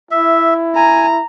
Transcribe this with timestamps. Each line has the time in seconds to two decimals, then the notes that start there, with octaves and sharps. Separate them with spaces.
0.11 E4 E5
0.76 G#5 A#5